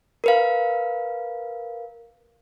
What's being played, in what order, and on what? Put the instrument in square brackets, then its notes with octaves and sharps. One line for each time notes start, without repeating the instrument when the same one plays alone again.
[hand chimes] A#4 B4 F5